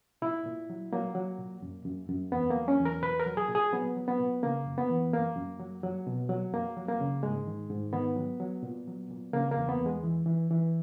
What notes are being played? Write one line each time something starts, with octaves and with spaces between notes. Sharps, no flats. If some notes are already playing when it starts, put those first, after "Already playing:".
A#2 E4
A#2
F#3
F#3 A#3
F#3
A#2
F#2
F#2
F#2
E2 B3
A#3
F#3
C#4
E2
A#4
A#2 B4
A#4
F#3
G#4
A#2
G#4
F#3 B3
F#3
B3
A#2
C#3 A#3
F#2
B3
E3
F#2 A#3
F#2
F#3
F#3
B2
F#3
F#2 A#3
F#3
A#3
C#3
G#2 G#3
D#3
G#2
D#3 B3
F#3
F#3
A#2
F#3
A#2
C#3 A#3
A#3
E2
B3
E2
G#3
E3
E3
E3